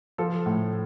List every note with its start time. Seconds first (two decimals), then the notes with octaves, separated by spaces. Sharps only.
0.18 F3 A4
0.46 A2